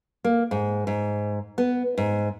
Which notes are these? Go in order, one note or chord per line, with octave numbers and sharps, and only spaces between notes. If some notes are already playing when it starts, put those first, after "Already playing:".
A#3
G#2
G#2
B3
G#2